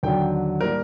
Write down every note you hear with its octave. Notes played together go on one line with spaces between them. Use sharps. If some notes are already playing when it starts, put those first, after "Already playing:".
D#2 D3 F#3 G5
A2 G3 A#3 A#4